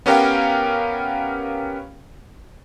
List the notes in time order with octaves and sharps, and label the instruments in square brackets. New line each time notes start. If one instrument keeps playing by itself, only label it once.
[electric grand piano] B3 C#4 G4 A#4 F5 G5